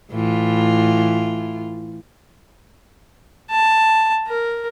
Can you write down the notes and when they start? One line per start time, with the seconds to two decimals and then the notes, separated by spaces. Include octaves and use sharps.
0.11 A2 E3 F4
3.50 A5
4.28 A#4